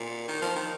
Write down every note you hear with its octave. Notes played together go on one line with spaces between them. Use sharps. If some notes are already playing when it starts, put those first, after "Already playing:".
Already playing: A#2
D#3
F3
D#3